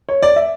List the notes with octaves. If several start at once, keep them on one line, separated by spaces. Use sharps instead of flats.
C#5
D5
E5